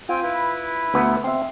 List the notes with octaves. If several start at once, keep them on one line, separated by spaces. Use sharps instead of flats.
C4 F4 G5 G#5
E4 B4
D2 B3 E5
C4 E5 F5